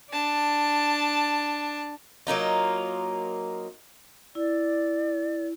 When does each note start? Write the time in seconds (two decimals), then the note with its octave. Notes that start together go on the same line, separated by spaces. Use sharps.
0.11 D4 A5
2.27 F#3 A#3 D#4 F4
4.35 E4 D5